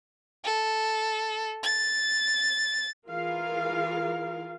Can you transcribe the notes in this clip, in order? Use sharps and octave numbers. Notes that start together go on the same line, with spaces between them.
A4
A6
E3 F4 G#4 A#4 F5